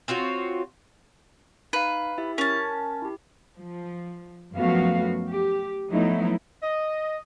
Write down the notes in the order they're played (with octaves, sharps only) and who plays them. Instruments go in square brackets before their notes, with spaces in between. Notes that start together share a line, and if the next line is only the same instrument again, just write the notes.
[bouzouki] C4 F4 F#4 C#5
[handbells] D#4 F5 [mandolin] B4
[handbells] E4 G4 E5
[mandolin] C#4 A5 [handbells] A#4
[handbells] E4 G4
[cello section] F3
F#2 F3 A3 B3 F#4 F5
G4
F3 F#3 A3 B3 D#4 E4
[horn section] D#5